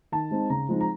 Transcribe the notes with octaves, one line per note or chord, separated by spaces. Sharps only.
D#3 A5
G#3 C4 D#4
C#3 A#5
F3 G#3 C4 D#4
A#5